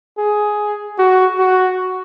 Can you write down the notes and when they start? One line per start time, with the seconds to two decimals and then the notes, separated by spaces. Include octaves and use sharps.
0.18 G#4
0.98 F#4
1.39 F#4